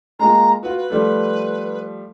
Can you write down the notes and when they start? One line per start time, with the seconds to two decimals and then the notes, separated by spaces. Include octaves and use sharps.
0.19 G#3 A#3 F4 A#5
0.63 F4 F#4 B4
0.77 B4
0.90 F3 G3 A3